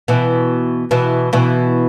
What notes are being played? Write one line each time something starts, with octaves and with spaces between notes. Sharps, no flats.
B2 E3
B2 E3
B2 E3